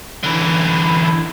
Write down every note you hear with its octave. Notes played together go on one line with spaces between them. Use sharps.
D3 E3